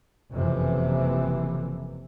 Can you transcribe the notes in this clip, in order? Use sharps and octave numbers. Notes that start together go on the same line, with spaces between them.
F#1 F2 C3 E3